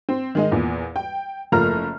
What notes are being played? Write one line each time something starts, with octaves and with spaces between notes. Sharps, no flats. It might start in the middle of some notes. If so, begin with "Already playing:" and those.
C4
D#3 G#3 D#4
E2 A#2
G5
F#1 F3 A3 A#3 A#5 F6